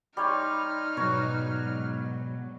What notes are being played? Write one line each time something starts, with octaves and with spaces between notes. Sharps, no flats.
G3 D#4 C#5 C6 F6
G#2 B2 F#3 F#4 C#5